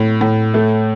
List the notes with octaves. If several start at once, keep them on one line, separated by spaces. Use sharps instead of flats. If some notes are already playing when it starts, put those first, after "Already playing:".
Already playing: A2
A2
A3